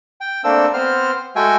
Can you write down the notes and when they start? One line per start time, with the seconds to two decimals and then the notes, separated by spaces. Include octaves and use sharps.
0.21 G5
0.44 A3 A#3 C4 D4 E6
0.74 B3 C4 C5 F6
1.36 G#3 A3 F#4 E5 G5 G#5